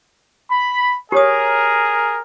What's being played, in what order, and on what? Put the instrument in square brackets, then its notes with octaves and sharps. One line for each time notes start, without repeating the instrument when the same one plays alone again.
[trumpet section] B5
[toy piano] G4 C#5 D#6 [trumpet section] G#4 A#4